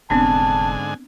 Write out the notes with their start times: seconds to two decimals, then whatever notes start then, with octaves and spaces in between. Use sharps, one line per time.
0.10 F1 G#2 D3 B3 C4 D4 G#5 A5